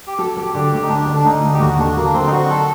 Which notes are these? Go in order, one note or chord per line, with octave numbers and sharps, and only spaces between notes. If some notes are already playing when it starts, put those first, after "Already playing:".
G4
F#3 A4
F#3 G4
D3 G4
D2 G4
D#4
D2 D4
D3
D4
D2 D#4
D2
G4
D#2 F#4
D3 D4
F#3 A#3
D3 C4
D#4
F#3 F#4
A4